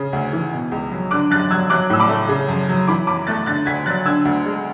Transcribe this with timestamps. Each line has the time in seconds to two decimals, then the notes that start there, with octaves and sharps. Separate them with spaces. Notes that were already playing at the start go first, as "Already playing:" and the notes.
Already playing: C#3
0.13 D2
0.33 E3
0.53 B2
0.72 C#2
0.91 F#3
1.11 D3 D6 F#6
1.30 F#2 F#6 A6
1.50 F#3 E6 G#6
1.70 F#3 D6 F#6
1.90 A2 E6
2.00 B5 D6
2.09 A3
2.29 C#3
2.48 F#2
2.69 F#3
2.87 E3 B5 D6
3.07 F#2 B5 D6
3.27 A3 F#6 A6
3.46 D3 F#6 A6
3.66 D2 G#6 B6
3.86 F#3 F#6 A6
4.05 D3 E6 G#6
4.25 D2
4.45 G#3